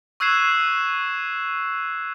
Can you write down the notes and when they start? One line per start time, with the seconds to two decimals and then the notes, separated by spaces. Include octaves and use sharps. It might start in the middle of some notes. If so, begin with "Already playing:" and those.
0.20 C#6 E6 F#6 G#6 C7 E7